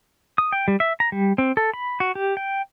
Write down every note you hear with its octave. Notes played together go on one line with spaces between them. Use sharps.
D#6
G5
G3
E5
A#5
G3
C4
A4
B5
F#4
G4
G5